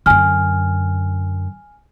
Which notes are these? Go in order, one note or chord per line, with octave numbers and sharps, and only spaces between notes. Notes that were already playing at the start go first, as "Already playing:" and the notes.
F#2 D3 G#5 F6